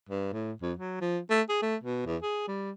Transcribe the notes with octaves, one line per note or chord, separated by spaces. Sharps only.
G2
A2
F2
F#3
F3
A3
G#4
A3
B2
E2
G#4
G3